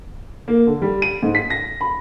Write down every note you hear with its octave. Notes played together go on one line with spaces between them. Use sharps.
A#3
D3
G3
D#7
G#2
B6
A#6
B5